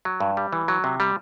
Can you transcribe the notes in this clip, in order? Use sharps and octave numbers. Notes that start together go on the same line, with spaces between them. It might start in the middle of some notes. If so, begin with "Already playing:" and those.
F#3
G2
G3
E3
F#3
C3
G3